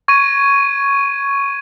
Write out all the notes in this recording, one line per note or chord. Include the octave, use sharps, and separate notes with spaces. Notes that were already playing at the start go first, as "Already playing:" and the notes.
C#6 G#6 D#7